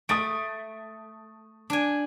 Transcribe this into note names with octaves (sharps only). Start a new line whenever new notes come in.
A3 D#6 A6 D7
D4 G#5